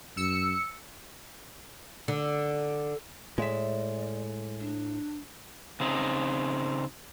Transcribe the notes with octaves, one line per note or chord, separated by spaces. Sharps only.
F#2 E6 C#7
D3
A2 G#3 D5 E5
D4
C#3 C4 D#4